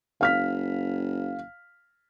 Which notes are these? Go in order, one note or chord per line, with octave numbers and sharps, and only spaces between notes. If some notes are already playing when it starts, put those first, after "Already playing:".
F#1 F5 F6 B6